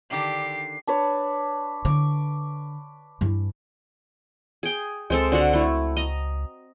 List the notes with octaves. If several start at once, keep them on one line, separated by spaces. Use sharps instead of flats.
D3 D#3 D4 G4 C7
D4 B4 C#5
D3 C#6 D6
G2 E3
G#4 G5
C#2 G#3 C4 A4
D3 F#4 F#5
A3 E4
D#5 A#5